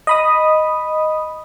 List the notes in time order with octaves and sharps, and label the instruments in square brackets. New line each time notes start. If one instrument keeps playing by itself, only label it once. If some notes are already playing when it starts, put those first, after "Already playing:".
[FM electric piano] D#5 B5 D#6